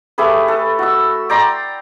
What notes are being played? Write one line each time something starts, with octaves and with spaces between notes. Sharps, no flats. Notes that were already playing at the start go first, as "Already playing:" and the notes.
A3 G4 G#4 B4
A4
F#4 E6
D5 G5 A#5 C6